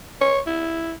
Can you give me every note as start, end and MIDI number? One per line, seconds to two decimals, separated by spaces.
0.21 0.39 73
0.47 0.93 64